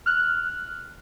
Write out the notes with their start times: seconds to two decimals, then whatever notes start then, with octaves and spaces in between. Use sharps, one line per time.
0.06 F6 F#6